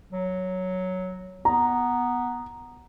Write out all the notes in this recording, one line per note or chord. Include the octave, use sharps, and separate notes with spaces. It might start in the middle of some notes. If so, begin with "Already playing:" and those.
F#3
B3 A#5